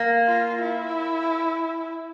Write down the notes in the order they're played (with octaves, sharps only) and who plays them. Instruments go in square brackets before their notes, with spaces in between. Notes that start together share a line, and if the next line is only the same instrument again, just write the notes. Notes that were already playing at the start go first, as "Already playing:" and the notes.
Already playing: [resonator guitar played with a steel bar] A#3
[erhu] F4
E4